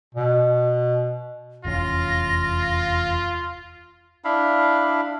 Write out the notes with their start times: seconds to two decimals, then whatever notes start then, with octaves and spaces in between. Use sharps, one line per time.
0.15 B2
1.65 F1 E2 C#4 F4 A#6
4.25 D4 E4 F5 B5